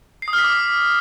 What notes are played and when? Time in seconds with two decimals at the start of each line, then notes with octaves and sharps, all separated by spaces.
0.22 C7
0.28 D#6
0.33 F6
0.39 B6
0.44 D6